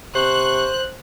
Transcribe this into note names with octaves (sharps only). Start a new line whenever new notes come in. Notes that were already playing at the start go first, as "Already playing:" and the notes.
C3 C5 C#6 F#6